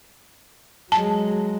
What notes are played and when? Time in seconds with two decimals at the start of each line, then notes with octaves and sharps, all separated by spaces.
0.92 F#3 G#3 A5